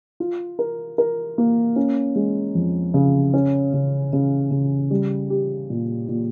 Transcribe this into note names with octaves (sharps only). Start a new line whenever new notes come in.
F4
A#4
A#4
A#3
C#4
G#3
F2
C#3
C#4
C#3
C#3
C#3
G3
G4
A#2
A#2